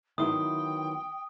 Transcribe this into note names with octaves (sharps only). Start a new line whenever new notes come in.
D#3 F#3 B3 E4 G5 C6 D#6